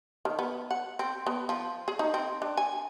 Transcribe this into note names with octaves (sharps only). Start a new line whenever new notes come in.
D#3
B3
F#5
C4
B3
F3
G#4
D#4
C4
D4
G#5